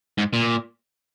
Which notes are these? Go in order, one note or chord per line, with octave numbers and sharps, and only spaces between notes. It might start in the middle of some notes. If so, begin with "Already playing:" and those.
G#2
A#2